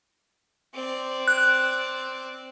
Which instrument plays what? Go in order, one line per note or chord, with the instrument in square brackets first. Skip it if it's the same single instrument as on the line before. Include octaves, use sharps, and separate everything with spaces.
[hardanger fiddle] C4 D5
[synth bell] F#6